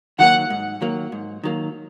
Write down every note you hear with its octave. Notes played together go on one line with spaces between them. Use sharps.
D#3 F#3 A#3 F#5
G#2
D#3 F#3 A#3
G#2
D#3 F#3 A#3